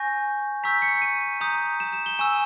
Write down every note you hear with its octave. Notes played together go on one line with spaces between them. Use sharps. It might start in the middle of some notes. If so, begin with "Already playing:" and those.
Already playing: G#5 C#6 G6 A#6
A#5 C#6 E6 G6 B6
C#7
D#7
A#5 D#6 G6
E7
E7
G7
G#5 C#6 E6 E7